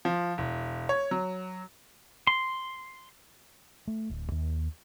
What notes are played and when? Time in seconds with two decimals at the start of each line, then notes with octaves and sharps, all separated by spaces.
0.05 F3
0.38 E1
0.89 C#5
1.11 F#3
2.27 C6
3.87 A3
4.09 D1
4.32 D#2